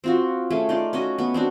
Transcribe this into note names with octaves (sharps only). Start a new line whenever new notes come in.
C4 F4 F#4
A3 C#4 G#4
D#4 F4 D5
C#4 F#4 D#5
B3
C4 D4 F#4